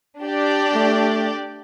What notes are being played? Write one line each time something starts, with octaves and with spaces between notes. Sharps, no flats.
D4 G4 D5
A3